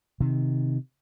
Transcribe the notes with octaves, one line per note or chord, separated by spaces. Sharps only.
C3 D#3